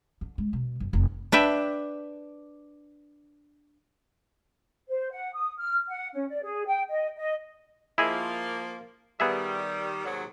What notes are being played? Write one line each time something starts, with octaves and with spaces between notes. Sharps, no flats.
D3
G#3
B2
F#1
F1
D4 B4 E5 G5
C5
F#5
D#6
F6
F#5
C#4
D5
G#4
G5
D#5
D#5
F3 A#3 E4 G#4 D#5
D#3 G3 B3 G#4 E5
D#2 G#2 F#3